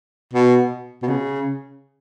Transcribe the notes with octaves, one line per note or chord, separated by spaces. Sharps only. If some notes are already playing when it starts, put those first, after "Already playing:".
B2
B2
C#3